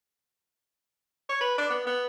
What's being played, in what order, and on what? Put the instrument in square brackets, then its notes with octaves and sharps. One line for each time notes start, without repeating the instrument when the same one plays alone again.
[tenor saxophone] C#5
B4
D4
B3
B3